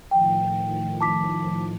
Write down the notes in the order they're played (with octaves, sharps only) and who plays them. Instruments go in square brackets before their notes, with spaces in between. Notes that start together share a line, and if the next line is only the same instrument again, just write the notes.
[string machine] A2 D#3 F3 [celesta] G5
[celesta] A5 D6 B6